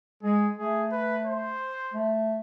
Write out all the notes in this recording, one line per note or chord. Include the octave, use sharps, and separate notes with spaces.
G#3 G#4
A3 G#4
B4
C5
A3